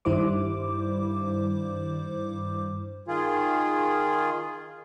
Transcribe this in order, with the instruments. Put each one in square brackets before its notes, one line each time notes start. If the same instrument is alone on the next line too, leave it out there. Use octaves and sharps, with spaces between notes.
[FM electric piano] G2 D#3 G3 E4 C5 D6
[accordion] D#3 F4 G#4